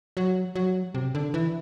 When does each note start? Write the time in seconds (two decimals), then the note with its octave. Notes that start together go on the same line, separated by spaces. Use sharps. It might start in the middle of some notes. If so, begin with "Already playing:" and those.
0.17 F#3
0.55 F#3
0.94 C3
1.15 D3
1.34 E3